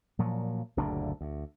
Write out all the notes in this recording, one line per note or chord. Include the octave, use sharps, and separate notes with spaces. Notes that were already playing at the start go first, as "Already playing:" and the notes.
A#2 F3 F#3
F#1 D2 A#2 D4
D2